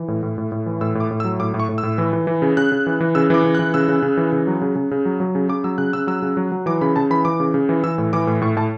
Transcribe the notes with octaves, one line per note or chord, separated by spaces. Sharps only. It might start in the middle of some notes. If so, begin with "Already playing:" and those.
Already playing: E3
A2
A2
A2
A2
E3
A2 E6
A2
D6
A2
E6
F#3
A2 D6
A2
C#6
A2
E6
A2
E3
E3
E3
C#3
C#3 F#6
C#3
E3
E3
C#3 E6
E3 D6
C#3
F#6
E3
C#3 E6
C#3
C#3
E3
C#3
F#3
C#3
C#3
C#3
F#3
F#3
C#3
C#3 D6
F#3 E6
C#3 F#6
C#3 E6
F#3 E6
C#3
F#3
F#3
E3 D6
C#3 B5
C#3 A5
E3 B5
E3 D6
C#3
C#3
E3
E3 E6
A2
E3 D6
A2
A2 C#6
A2 A5